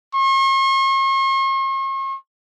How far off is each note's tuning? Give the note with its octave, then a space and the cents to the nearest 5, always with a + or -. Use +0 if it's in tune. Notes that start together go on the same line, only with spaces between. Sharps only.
C#6 -45